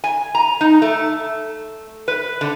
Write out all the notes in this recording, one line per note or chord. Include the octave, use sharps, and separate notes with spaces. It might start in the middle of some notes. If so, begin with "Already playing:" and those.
G#5
A#5
D#4
A3
B4
D3